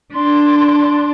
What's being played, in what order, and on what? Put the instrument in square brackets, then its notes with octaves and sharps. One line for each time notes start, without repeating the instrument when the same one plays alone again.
[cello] D4 [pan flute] C6